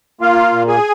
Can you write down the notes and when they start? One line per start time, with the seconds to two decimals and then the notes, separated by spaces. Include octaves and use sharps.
0.21 A#3 F4 F5
0.52 A#2
0.68 G#4 G#5